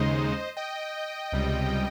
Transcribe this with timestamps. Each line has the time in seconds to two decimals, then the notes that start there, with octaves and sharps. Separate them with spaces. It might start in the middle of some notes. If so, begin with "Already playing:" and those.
Already playing: D#2 C#3 G#3 D#4 C5 D#5
0.57 D#5 G5
1.32 C#2 C3 G3